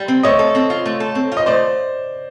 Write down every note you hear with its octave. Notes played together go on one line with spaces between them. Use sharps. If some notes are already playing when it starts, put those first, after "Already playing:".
Already playing: G3
C4
A3 C#5 D#5
A4
C4
F4
A3
A4
C4
F4
D#5
A3 C5 D5